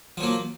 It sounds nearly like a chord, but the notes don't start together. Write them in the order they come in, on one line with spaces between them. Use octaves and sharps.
F3 F#3 A#3